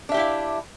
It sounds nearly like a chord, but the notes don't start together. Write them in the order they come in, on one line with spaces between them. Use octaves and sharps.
D4 E5 G4 E4 F5